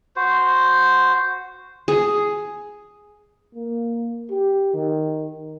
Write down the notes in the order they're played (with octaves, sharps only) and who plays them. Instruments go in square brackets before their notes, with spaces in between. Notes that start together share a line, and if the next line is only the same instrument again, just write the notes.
[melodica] F#4 C5
[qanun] G#4
[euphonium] A#3
G4
D#3